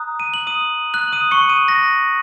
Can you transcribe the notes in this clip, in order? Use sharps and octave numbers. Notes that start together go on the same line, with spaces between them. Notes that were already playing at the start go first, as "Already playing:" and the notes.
Already playing: A#5 D#6 F#6
D#7
F#7
D#6 D#7
F#6 F#7
D#6 D#7
C#6 C#7
D#6 D#7
A#6